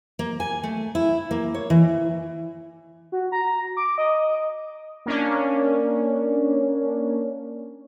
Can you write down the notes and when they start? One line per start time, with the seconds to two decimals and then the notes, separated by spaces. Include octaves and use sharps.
0.19 A#3
0.40 G#5
0.63 A3
0.95 E4
1.31 A#3
1.54 C#5
1.70 E3
3.12 F#4
3.32 A#5
3.77 D6
3.98 D#5
5.06 A#3 C#4 D4